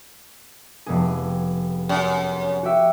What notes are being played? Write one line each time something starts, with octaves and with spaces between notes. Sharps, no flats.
F1 B3 G#4
F#2
F#4 G4 E5